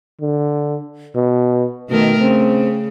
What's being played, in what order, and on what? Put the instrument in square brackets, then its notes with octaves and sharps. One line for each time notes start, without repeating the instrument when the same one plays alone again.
[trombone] D3
B2
[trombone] B2 [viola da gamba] D#3 A3 A#4
[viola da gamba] C#3 [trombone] C4